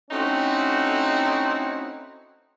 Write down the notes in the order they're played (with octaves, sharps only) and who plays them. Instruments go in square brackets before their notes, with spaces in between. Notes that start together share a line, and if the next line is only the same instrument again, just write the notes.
[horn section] A3 C4 C#4 D#4 E4 F#4